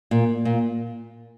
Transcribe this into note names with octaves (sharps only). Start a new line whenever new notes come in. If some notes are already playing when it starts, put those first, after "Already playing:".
A#2
A#2